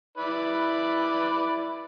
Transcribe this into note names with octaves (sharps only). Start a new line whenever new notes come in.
E4 B4 D5